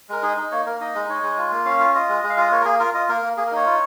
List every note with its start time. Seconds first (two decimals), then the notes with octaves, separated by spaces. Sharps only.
0.09 G#3 A#4
0.23 D#4 G#4
0.37 D#4
0.51 A#3 C#5
0.66 A#3 A#4
0.80 D#4 D#5
0.95 G#3
1.09 D#4 C#5
1.23 G#3
1.38 F4
1.52 A#3
1.65 C#4 F5
1.80 F4
1.95 F4 D#5
2.09 G#3
2.23 G#3
2.30 F5
2.37 F4 D#5
2.51 A#3 C#5
2.61 A#4
2.65 A#3 G#4
2.79 F4 A#4
2.94 F4 D#5
3.09 A#3 A#4
3.23 A#3
3.37 A#3 G#4
3.47 A#4
3.52 D#4 C#5
3.66 F4